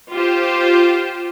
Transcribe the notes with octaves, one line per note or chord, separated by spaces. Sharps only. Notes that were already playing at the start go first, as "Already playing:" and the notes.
F4 G4 C5